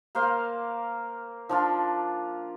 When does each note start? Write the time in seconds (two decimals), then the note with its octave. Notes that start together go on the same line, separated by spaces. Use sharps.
0.15 A#3 C5 F5
1.49 F3 D4 F4